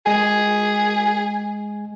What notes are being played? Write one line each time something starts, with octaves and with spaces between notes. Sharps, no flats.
G#3 G#4 G#5